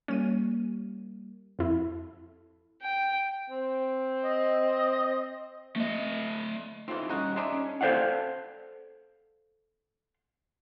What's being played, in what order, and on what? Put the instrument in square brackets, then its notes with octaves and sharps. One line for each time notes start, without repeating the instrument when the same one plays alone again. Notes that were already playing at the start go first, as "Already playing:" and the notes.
[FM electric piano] G3 A#3 [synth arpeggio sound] C#4 D#7
[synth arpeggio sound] F2 E4 [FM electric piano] A4
[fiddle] G5
[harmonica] C4
[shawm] D#5
[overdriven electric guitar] A3 D#5
[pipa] E3 C4 [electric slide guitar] D#4 F4 A4
[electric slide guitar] G3 C#4 G4 [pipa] D#4 F#4
[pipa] G#3 D4 D#4 [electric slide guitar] E5
[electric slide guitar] C#4
[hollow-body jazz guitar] A4 C5 D5 F5 F#5